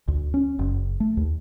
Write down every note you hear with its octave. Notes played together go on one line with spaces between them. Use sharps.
D2
C#4
F#1
A3
D#2